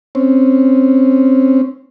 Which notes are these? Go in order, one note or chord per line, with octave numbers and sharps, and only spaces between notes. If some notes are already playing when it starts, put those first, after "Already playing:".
C4 C#4